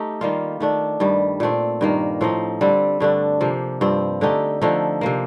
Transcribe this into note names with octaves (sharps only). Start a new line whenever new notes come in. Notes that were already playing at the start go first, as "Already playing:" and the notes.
Already playing: A3 D#4 G4
D#3 G3 A#3 F4
D#3 A3 D4
G2 D#3 G3
A#2 A3 C4
G2 D#3 A#3
A2 F3 C4 D#4
D3 G3 C4
G2 D3 A3 D4
C3 F3 A#3
G2 F3 C4
D3 A3 D#4 G4
D3 F3 A3 D#4
C3 F3 A#3